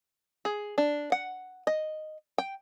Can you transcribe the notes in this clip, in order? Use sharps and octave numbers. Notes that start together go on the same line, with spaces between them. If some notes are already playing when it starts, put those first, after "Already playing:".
G#4
D4
F#5
D#5
G5